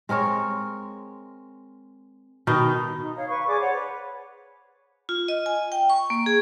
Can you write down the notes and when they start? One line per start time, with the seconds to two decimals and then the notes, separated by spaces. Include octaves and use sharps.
0.09 G#3 C4 A#4 C#5
2.47 B2 D#3 D#4 G5
2.99 D#4
3.16 C#5 F5
3.28 B4 F5 C#6
3.45 G#4 D5 D6
3.59 C5 C#5 F#5
3.72 B4
5.09 F4
5.28 D#5
5.46 G#5
5.72 G5
5.90 C#6
6.10 A#3
6.26 G#4